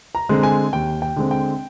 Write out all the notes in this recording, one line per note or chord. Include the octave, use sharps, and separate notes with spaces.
A#5
D3 G#3 C4
G#5
D#2 G5
G5
D3 G#3 C4
G5